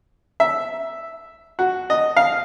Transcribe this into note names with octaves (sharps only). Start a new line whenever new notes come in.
E5
F#4
D#5
F5